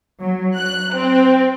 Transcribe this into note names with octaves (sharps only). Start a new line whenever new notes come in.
F#3
F#6
C4